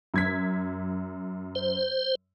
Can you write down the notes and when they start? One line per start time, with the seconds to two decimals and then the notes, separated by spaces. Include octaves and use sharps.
0.14 F#2 G#6 B6
1.55 C5